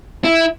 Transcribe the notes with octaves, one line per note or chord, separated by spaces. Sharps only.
E4